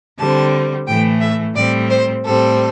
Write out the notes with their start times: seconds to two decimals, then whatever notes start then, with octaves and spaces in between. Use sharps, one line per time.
0.18 D3 G3 C4 A5
0.87 A2 E3 A3 G5
1.21 E5
1.56 A2 G3 C4 D5
1.90 C5
2.24 A2 G3 C4 A4